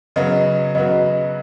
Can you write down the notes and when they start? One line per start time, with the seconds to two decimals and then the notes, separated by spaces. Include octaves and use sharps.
0.16 C#3 F#3 B3 F#4 D#5
0.75 C#3 F#3 B3 F#4 D#5